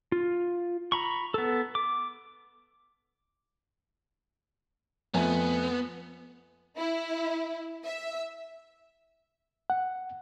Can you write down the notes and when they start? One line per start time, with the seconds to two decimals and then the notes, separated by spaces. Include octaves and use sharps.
0.12 F4
0.92 A#5 B5 C#6
1.34 B3 A4
1.75 D6
5.14 F2 A3 B3 G#5
6.77 E4
7.85 E5
9.70 F#5